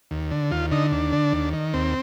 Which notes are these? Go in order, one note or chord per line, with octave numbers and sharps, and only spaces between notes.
D#2
D3
D#2 F4
D3 D#4
D#2 D4
D3
D#2
D#3
D#2 C4